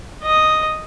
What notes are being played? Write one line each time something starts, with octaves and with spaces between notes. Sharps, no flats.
D#5 D#6